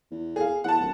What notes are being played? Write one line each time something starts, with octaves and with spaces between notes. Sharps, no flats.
E2
G#4 F5
E2 F#5 A5
D1